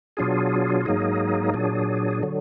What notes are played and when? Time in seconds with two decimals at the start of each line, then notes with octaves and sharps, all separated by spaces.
0.17 B2 F#3 D4 F4 G#4
0.85 G#2 F#3 A#3 D#4 G#4
1.54 A#2 F#3 D4 G#4
2.23 D3 F#3